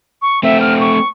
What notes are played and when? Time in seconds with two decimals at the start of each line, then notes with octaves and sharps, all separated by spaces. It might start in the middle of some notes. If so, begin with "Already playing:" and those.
0.22 C#6
0.43 A3 C4 E5
0.61 F6
0.80 C#6